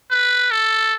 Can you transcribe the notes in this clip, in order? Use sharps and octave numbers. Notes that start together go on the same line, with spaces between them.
B4
A4